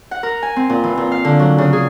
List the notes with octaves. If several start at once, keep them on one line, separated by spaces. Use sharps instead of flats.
F#5
A#4
G#5
C4
A#2
E3
A#2
F5
D3
F#3
C#3
G#4